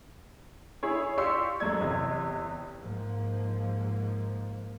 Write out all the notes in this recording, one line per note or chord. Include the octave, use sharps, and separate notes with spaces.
E4 G#4 C#5
F4 G4 D5 C6 C#6 E6
F#2 G#3 A3 D5 G#6
G1 E2 C3 D#5
G#2 F3 A#3